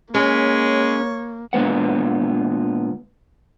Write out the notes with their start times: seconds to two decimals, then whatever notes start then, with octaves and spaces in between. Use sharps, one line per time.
0.15 G#3 A#3 C#4 C#5
1.53 A#2 D3 G#3 B3 F#5